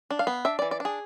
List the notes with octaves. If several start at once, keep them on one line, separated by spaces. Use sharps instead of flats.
D4
F5
B3
D4 E5
E3 D5
D5
D4 G#4